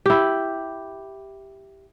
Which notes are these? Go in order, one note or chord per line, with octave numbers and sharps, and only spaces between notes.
E4 G4